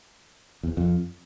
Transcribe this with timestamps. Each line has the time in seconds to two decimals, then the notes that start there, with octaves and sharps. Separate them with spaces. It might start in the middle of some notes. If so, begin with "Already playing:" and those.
0.63 E2
0.77 F2